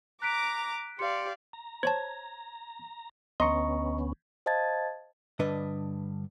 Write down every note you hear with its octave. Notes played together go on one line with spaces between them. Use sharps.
A#5 D6 F#6 B6 D7
G4 D5 F5 C6 C#7
A#5
C5 C#5 A5 G#6
D2 B3 C#4 D#5 A#5 C6 C#6
C5 D#5 F5 A5 G#6 A6
G2 D3 D4 B4 D#5